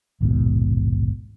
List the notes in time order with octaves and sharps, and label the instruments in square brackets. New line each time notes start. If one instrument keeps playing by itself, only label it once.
[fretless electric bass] A#1 D#2 G#2 B2